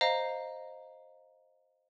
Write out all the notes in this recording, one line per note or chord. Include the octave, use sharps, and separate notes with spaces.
C5 D#5 F5 A#5